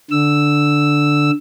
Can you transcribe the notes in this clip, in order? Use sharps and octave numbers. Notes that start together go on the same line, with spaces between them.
D3 E6